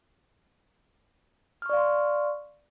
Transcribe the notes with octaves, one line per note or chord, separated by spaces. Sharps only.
D5 F5 C6 C#6 F6